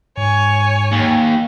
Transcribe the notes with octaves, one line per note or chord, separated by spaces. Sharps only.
G#2 C#5 G#5
D#2